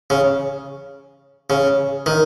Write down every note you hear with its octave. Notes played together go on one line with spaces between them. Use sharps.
C#3
C#3
D#3